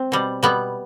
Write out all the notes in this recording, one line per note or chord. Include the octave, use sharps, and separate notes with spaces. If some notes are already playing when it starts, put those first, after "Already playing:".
Already playing: C4
B2 G3
B2 G3 B3